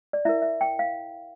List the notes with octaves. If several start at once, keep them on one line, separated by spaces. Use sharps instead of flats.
D5
E4 A#4 E5
E5
G5
F5